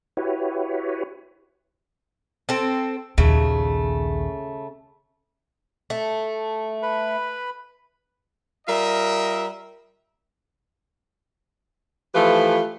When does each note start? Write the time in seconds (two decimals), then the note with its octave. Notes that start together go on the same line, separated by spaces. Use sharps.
0.17 E4 F#4 G4 B4 C#5
2.49 C4 A4
3.18 A#1 D#2 C#3 A3
5.90 A3
6.83 B4 B5
8.68 G3 F4 A#4 D#5 E5
12.14 E3 F3 A3 F4 G4 B4